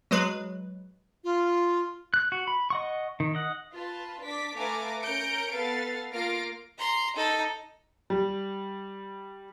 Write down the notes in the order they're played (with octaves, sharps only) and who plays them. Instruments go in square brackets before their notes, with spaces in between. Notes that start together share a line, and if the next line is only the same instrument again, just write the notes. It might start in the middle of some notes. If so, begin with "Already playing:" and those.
[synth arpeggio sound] F#3 G#3 B4
[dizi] F4
[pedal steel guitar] F#6
F#4
B5
D#5 F#5 C#6
D#3
D#5 F#5
[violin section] F4 B4 A5
D4 D6 B6
A3 B4 F5 G#5 A#5 D6
C#4 A#4 A#5 G6 C#7 D7
B3 A4 B4 F5 A6
A#3 F4 F5 A#6 D7
[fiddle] A#5 C6
D#4 A4
[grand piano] G3